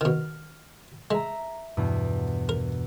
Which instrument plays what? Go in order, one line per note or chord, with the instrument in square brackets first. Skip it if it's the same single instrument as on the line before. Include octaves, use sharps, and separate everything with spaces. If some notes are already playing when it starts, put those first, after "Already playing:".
[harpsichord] B2 D#3 [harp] F6
[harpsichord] G#3 [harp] E5 A#5
[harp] E2 G2 B2
[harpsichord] A#4